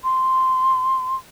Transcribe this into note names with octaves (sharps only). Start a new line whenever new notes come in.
C6